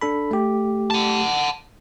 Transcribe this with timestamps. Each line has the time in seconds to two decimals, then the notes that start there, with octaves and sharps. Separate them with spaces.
0.01 D4 A4 B5
0.31 A3 G4
0.91 F#5 A5